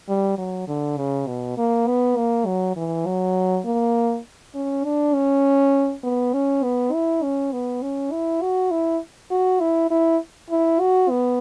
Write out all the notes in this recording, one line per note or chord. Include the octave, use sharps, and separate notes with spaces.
G3
F#3
D3
C#3
B2
A#3
B3
A#3
F#3
E3
F#3
A#3
C#4
D4
C#4
B3
C#4
B3
E4
C#4
B3
C#4
E4
F#4
E4
F#4
E4
E4
E4
F#4
B3